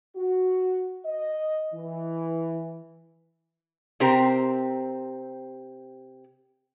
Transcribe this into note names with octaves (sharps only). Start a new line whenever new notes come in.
F#4
D#5
E3
C3 C4 G4 A#4 C5 A#5